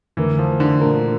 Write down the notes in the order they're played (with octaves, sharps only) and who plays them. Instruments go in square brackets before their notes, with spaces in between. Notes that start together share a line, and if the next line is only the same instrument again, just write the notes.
[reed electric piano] F2 D3 A3 E4 A#4 [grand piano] E3
[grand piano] F3
D3
[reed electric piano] A#2 A3 D4 F4 A#4